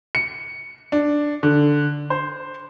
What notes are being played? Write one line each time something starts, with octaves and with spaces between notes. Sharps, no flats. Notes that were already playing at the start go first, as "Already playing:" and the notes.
C#7
D4
D3
C5